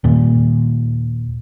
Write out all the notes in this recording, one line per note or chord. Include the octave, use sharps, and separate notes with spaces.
D#2 A#2